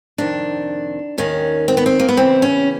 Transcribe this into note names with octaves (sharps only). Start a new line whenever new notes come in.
F2 C3 D#3 D4
D#2 D#3 C#4
C4
B3
C4
A#3
B3
E2 C#3 E3 C4
C#4